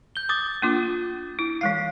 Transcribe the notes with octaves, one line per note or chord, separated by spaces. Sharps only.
G6 G7
D6 D#6 A6
A#3 D4 F4
E4
E3 G#3 F5 C7